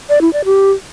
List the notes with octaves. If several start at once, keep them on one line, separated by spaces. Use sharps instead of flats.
D5
E4
D5
G4